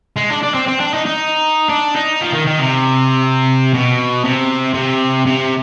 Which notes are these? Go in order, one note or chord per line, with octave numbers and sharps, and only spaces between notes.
G#3
D4
D4
C4
C4
D4
D#4
D#4
D4
D#4
F3
D#3
D#3
C3
B2
C3
C3
C3